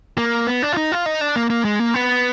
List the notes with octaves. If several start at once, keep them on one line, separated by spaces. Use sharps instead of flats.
A#3
B3
D4
F4
D#4
F4
D#4
D4
A#3
A#3
G#3
A#3
B3